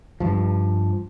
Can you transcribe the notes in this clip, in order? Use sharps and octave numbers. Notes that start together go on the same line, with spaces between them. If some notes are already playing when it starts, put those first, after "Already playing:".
G2 F3